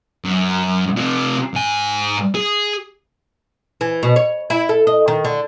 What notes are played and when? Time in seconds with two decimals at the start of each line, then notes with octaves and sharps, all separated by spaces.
0.25 F#2
0.97 C3 F4
1.54 G#2 G#5
2.35 G#4
3.81 E3
4.03 B2
4.16 C#5
4.50 E4
4.69 A4
4.87 D#5
5.08 D#3
5.25 D3